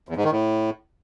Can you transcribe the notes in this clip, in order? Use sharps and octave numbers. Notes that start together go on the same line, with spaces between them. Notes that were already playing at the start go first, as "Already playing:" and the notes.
E2
G#2
D#3
A2